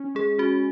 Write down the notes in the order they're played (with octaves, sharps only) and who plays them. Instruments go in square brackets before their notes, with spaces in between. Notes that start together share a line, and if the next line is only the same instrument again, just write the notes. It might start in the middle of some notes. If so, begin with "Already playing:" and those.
Already playing: [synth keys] C#4
[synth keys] G#3 [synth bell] G#4
[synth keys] C#4 [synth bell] F#4